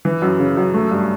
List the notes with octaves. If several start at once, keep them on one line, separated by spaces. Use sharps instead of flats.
E3
F#2
C#3
F#2
A3
G2